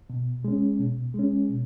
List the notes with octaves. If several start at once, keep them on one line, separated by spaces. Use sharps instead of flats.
B2
G#3 C#4
B2
G#3 C#4
B2